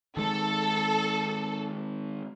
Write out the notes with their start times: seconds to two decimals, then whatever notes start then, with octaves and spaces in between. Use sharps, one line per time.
0.17 D#3 G#3 A4